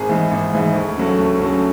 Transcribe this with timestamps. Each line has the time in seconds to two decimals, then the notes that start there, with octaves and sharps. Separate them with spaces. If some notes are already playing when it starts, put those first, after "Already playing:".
Already playing: G#1 G#4
0.09 G#2 E3 G#3
0.31 G#1
0.53 G#2 E3 G#3
0.74 D2
0.96 C#3 F#3 A3
1.18 D2
1.40 C#3 F#3 A3